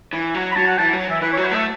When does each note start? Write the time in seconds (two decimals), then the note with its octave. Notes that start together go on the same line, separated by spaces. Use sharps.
0.13 E3
0.34 F#3
0.52 B5
0.56 F#3 A5
0.67 F#5
0.78 E3 A5
0.93 F#3
1.07 E3 E5
1.21 E3 B4
1.33 F#3 C#5
1.44 B4
1.52 A3 E5